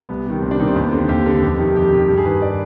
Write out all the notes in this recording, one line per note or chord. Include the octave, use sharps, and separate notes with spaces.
C2 B3
C3 D#3
C2 C4
D4
C3 D#3 D#4
C4
D#2 B3
D3 C4
D#2 G4
D3
F2
C3 D#3
F2 G4
C3 D#3
G2 G4
G#4
D#3 B4
D5